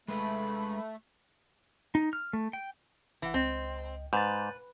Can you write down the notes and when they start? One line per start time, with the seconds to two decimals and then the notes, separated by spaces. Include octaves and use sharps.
0.08 G#3 A3 B4 B5
1.95 D#4
2.13 F6
2.33 A3
2.53 G5
3.22 G1 E3 F#5
3.34 C#2 C4 D#5
4.13 G#2 B4 G6 A6